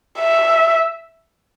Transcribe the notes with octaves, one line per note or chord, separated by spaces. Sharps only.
E5